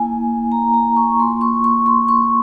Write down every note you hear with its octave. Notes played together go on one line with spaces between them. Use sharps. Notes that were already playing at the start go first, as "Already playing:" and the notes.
Already playing: A#3 E4 G#5
A#5
A#5
C#6
A#3 F4 C6
C#6
C#6
C6
C#6